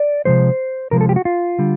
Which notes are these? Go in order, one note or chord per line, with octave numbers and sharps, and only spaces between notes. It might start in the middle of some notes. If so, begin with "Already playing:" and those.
Already playing: D5
C3 F3 G#3 C5
C3 F3 G#3 A#4
A4
G4
F#4
F4
D3 G3